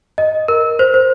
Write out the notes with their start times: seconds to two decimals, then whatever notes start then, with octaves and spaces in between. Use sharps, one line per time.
0.18 D#5
0.48 A#4
0.79 C5
0.94 C5